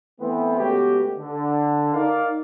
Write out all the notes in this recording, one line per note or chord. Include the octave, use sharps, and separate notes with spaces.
E3 A3 B3 C4
C#3 G#3 A3 B3 F#4 G4
D3
D#4 A#4 D5 F5